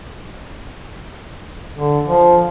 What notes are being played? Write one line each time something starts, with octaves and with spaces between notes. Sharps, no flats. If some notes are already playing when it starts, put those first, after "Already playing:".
D3
F3